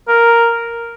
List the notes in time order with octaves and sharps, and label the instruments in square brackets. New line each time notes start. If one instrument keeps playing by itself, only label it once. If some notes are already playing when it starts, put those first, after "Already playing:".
[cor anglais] A#4